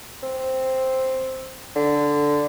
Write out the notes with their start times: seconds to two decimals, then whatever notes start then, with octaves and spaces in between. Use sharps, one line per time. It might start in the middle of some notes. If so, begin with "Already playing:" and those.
0.23 C4
1.76 D3